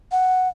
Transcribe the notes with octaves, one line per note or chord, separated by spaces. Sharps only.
F#5